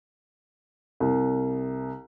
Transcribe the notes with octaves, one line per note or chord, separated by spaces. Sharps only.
C2